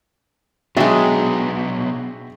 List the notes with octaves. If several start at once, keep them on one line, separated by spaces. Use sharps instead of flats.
B2 F#3 G#3 D4 F#4 E5 G5